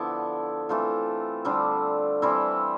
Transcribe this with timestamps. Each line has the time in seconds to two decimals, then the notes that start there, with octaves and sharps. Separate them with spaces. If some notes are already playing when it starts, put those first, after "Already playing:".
Already playing: D3 F3 B3 E4
0.69 E3 A3 C4 F4
1.45 D3 G3 C4
2.22 E3 G3 C4 E4